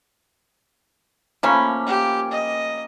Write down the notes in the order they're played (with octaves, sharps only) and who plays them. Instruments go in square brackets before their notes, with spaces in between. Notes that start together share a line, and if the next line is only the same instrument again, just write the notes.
[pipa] F3 A3 C#4 [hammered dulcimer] A#3 B5
[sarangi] G4
D#5